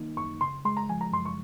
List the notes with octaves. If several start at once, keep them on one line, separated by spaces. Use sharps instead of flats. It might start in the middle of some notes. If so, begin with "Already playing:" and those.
Already playing: D#3 A#3 D#4
F#2 C#6
C#3 C6
G#3 C6
A#5
F3 G#5
A#5
F#2 C6
C#6